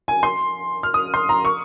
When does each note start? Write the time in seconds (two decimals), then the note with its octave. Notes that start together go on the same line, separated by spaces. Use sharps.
0.08 G#5
0.23 C6
0.83 F6
0.94 D#6
1.14 C6
1.29 A#5
1.45 C#6